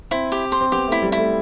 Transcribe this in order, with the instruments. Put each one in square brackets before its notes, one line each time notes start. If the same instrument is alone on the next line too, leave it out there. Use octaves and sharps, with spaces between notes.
[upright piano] C4 [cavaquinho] E4
[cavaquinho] G4
C5
[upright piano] C4
[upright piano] B3 [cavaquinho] G4
[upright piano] A3 [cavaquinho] E4
[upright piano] G3
[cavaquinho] E4
[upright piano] A3